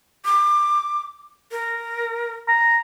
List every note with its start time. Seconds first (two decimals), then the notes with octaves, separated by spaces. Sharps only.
0.25 D6
1.51 A#4
2.48 A#5